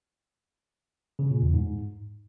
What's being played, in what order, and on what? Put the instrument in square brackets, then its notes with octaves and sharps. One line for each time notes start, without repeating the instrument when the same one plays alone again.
[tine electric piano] C#3
A#2
E2
G#2